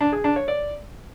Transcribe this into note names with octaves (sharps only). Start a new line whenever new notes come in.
D4
G#4
D4
C#5
D5